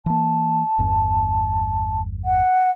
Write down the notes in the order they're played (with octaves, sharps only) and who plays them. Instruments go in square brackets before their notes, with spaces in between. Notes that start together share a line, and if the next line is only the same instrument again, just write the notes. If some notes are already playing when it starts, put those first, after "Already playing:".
[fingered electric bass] E3 A#3 [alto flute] A5
[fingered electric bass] G1 E2 G2
[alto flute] F#5